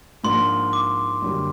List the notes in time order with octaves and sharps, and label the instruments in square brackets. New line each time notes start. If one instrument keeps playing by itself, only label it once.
[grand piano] G#2 F3 A#3 D4 [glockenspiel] C6
[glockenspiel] D6
[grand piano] F#2 D3 G3 A#3